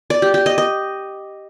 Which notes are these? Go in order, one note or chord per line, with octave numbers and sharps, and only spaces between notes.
D5
G4
G4
D#5
D#5